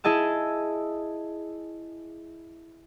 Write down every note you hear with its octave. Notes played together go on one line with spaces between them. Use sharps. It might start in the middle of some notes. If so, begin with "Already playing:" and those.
E4 G#4 D#5 A5 E6